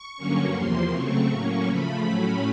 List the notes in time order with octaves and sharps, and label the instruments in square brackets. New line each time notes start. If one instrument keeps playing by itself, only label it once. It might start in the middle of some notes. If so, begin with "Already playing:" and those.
Already playing: [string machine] C#6
G2 D3 F#3 A#3 C#4
E2 C3 F3 A#3 C6
C#3 F#3 A3 C4 C#6
A2 F#3 A#3 C#4
C#3 F3 A3 B5
A2 F#3 A3 C#4